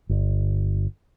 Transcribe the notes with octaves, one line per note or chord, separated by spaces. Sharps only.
G1